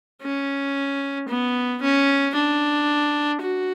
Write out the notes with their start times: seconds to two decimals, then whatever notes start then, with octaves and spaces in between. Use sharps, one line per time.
0.22 C#4
1.29 B3
1.82 C#4
2.36 D4
3.42 F#4